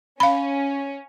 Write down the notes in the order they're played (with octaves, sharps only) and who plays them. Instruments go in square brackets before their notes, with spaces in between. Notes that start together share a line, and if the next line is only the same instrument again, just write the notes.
[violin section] C#4 [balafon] F5 B5